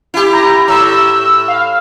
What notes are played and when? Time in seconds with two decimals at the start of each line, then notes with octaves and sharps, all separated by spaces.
0.14 E4 G4
0.33 A#5
0.68 A2 E6
1.48 F5